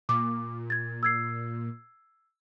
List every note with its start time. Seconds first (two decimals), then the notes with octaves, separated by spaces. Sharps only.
0.09 A#2 D6
0.70 G#6 A6
1.03 E6 G#6 C7